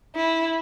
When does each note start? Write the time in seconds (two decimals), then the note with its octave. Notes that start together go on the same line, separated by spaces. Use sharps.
0.16 E4